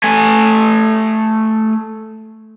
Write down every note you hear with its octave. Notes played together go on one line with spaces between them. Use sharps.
A3 G#5